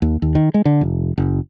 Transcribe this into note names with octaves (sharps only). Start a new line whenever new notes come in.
D#2
D#2
D#3
G#3
D3
F1
F#1